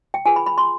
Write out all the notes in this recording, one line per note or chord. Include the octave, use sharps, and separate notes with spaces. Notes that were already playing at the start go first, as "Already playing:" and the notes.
G5
F4 G#4 B4 G#5
B5
B5
C6